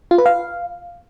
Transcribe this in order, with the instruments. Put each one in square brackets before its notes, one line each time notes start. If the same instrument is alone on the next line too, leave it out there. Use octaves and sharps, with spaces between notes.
[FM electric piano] F4
B4
F5